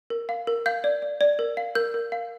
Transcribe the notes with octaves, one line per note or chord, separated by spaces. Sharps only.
A#4
F5
A#4
F5 G6
D5
D5
D5
A#4
F5
A#4 G6
A#4
F5